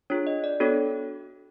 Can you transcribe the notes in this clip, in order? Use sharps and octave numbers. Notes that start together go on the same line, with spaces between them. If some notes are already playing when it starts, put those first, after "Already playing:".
D4 F4 G#4 C#5
D#5
D5
B3 D4 F#4 A4 C#5